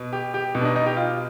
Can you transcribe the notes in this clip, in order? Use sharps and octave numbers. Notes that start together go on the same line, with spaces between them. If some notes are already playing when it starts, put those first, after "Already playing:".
Already playing: B2
G4
G4
B2
D4
D#4
D#4
G4
F4